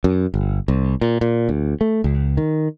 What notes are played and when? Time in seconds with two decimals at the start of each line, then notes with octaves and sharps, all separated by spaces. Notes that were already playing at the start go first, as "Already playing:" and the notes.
0.04 F#2
0.34 G1
0.68 C2
1.01 A#2
1.21 A#2
1.49 D2
1.81 A3
2.04 C#2
2.37 D#3